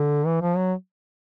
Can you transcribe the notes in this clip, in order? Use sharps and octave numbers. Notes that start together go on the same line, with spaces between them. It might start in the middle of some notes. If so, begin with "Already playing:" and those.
Already playing: D3
E3
F3
F#3